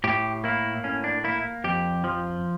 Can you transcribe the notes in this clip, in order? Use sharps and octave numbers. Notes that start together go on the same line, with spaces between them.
A2 G4
A#3 E4
A2 C#4
D4
A#3 E4
F2 G4
F3